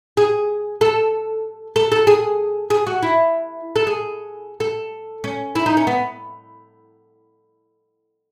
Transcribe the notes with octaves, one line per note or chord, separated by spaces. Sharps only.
G#4
A4
A4
A4
G#4
G#4
F#4
E4
A4
G#4
A4
C#4
E4
D#4
C#4
B3